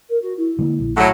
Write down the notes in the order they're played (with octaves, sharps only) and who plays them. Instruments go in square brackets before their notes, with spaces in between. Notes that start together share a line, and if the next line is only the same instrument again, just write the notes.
[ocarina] A#4
F#4
E4
[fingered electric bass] D3 G#3 A#3
A#1
[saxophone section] A2 F#3